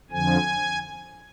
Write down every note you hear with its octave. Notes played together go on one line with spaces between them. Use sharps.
F2 D3 F3 G#5